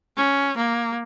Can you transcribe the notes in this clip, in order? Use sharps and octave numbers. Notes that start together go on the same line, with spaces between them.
C#4
A#3